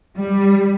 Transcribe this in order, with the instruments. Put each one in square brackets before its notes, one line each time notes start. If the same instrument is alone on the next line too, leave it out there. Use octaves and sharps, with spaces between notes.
[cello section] G3